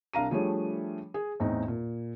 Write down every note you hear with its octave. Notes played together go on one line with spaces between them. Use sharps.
C2 D4 F5 A#5 D#7
F3 G3 A3 D4 G#4 C#5
G#4
E2 A2 C4 D#4
A#2